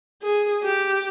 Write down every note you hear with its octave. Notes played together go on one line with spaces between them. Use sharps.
G#4
G4